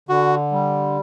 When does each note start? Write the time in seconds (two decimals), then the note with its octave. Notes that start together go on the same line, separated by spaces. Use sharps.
0.09 D3 F#4
0.52 G3